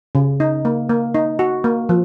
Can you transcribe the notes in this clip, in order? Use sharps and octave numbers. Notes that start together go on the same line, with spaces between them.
C#3
D#4
A#3
A#3
D#4
F#4
A#3
F3